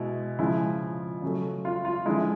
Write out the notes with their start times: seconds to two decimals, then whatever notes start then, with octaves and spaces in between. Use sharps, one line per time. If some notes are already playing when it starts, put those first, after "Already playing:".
Already playing: B2 G#3 E4
0.39 C#3 F3 G#3 E4
1.22 C#3 F#3 A3
1.65 F4
1.85 F4
2.06 D3 F3 G#3 E4